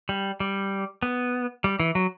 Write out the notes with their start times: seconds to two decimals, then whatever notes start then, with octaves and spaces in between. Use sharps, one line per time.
0.09 G3
0.40 G3
1.03 B3
1.64 G3
1.80 E3
1.95 F#3